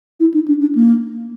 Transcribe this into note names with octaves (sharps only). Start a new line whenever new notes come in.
E4
D#4
D4
D4
A#3